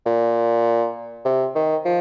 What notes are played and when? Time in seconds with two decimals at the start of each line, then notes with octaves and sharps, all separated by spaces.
0.06 A#2
1.25 C3
1.55 D#3
1.85 F3